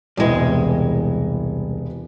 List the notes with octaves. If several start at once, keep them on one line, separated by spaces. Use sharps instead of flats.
E1 C2 E3 G#3 D#5